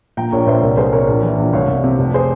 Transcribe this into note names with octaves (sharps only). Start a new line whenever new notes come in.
A#2 G5 A#5
A#1 A#4 C#5
A#1 C5 E5
C2 A#4 C#5
C2 G#4 C5
C3 A#4 C#5
A#1
E3
A#1
C2 C#5 F5
C2
C3
F1
G#4 C5